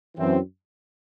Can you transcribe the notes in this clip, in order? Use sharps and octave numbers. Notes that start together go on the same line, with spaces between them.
F#2 E3 C4